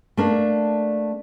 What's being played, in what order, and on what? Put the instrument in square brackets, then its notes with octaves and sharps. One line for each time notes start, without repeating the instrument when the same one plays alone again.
[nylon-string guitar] A3 A#3 D4